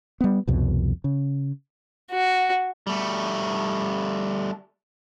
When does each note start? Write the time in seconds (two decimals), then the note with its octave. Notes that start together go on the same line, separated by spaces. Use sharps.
0.21 G3 B3
0.48 C2 F2 B2
1.04 C#3
2.11 F#4
2.87 G3 A3